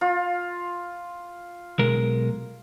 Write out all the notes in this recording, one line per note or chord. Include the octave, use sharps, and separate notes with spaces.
F4
B1 G#3 A#4